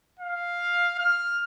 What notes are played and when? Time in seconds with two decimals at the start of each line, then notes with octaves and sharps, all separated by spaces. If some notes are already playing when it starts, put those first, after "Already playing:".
0.19 F5
0.99 F6